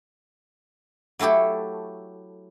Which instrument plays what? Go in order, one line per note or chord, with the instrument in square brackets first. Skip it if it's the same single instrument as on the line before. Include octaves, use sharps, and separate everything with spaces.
[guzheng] F#3 A3 E4 G4 A4